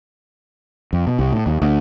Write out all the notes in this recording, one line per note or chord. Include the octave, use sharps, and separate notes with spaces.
F2
B2
C2
A2
D#2
D2